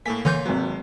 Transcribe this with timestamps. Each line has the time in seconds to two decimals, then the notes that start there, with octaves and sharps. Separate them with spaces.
0.06 A2 A#3 A4 G#5 B6
0.25 D3 E3 C#5 C6 G6
0.46 G#1 C3 F#3 B4